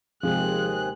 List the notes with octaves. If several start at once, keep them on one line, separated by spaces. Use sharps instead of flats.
D#2 C3 F3 G#3 C4 G#4 F#6